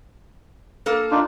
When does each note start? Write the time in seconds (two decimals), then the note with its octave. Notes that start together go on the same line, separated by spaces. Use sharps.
0.86 A#3 A4 A#4
1.11 D4 D#4 F4